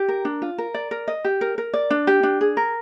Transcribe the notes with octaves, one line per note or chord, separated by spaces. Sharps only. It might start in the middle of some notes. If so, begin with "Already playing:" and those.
Already playing: G4
A#4
D4
F4
A#4
D5
A#4
D#5
G4
A#4
A#4
D5
D4
G4
D4
G#4
A#4